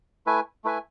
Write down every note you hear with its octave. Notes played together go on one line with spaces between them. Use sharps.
A3 E4 B4 E5 G#5
A3 E4 B4 E5 G#5